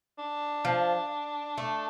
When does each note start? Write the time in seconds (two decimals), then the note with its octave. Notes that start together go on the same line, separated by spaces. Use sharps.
0.18 D4
0.65 F3
1.58 A3